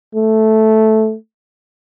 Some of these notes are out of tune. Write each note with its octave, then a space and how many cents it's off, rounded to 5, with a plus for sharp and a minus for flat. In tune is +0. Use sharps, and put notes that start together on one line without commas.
A3 -5